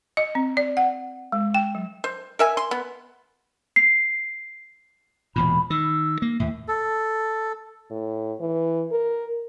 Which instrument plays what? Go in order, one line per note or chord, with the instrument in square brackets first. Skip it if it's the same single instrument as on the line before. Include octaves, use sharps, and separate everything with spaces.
[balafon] D#5
C4
D5
F#5
G#3
G5
F#3
[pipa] C5
A#4 E5 G#5
C6
B3
[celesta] C7
[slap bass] E1 E2 A#2 [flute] B5
[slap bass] D#3 [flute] E6
[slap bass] A#3
[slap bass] D#2 A2 [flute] E5
[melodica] A4
[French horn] A2
E3
A#4